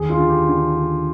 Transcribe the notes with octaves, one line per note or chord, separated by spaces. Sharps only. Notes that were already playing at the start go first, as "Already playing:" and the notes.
Already playing: D#2 G#4
F4
D3
G4
D3
D3